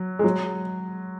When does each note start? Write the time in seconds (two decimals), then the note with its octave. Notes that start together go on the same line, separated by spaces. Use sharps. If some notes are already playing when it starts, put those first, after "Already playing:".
Already playing: F#3
0.19 G#3
0.24 F#3